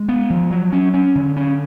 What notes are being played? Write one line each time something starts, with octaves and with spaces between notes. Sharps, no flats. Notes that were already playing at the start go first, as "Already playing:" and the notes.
Already playing: G#3
B3
F3
F#3
C#4
C#4
D3
C#4